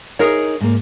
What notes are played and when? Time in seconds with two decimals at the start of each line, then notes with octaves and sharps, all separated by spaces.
0.19 D#4 G#4 A#4 C#5
0.61 G#2 A#3